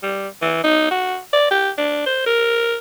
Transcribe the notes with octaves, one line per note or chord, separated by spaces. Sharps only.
G3
E3
D#4
F#4
D5
G4
D4
C5
A#4